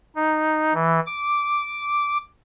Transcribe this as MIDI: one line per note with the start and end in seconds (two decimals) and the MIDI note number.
0.16 0.73 63
0.74 1.00 52
1.06 2.18 86